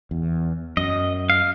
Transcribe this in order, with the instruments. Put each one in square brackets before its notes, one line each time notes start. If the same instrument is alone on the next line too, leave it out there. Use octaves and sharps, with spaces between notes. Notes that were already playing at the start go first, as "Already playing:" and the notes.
[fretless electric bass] E2
[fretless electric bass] F#2 [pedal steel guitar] D#5
[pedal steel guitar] F5